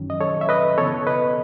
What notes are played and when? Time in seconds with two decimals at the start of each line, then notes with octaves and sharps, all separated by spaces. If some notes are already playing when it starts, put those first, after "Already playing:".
Already playing: F#2 D#3 F#3 C#4
0.10 D#5
0.21 A4 C#5
0.41 E5
0.49 B4 D#5
0.78 C#3 E3 B3 A4 C#5
1.07 B4 D#5